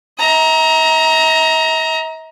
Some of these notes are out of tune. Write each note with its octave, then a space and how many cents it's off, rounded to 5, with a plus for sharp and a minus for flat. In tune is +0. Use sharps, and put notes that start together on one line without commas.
E5 -45 A#5 +10